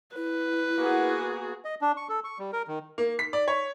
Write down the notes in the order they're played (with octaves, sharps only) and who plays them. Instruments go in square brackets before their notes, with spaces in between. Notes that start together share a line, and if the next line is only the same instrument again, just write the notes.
[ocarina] E4 [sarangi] B4
[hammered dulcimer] A#3 B3 [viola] F#4 G#4
[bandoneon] D#5
D4
C#6
A4
C#6
G3
A#4
D#3
[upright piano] A#3
B6
D5
C#5